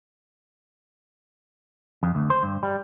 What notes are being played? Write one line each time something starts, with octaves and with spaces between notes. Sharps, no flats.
F2
D2
C5
G2
G3